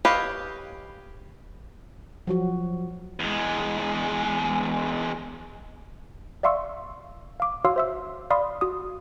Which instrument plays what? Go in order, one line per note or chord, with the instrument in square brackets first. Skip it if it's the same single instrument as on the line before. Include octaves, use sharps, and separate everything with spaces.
[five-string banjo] G4 B4 C#5 D#5 F5
[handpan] F3 F#3 F#4
[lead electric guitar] E2 G#3
[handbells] D5 E5 F5 C6 C#6 E6
F5 D6
F#4 C#5 F5 C6 E6
C5 E5 E6
D5 F5 B5 C6 D#6
F#4 D#6